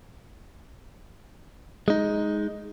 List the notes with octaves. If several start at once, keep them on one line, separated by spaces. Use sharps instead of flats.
G#3 D#4